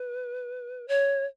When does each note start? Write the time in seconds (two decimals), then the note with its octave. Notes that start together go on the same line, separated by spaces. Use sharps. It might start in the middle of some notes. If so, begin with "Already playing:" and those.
Already playing: B4
0.88 C#5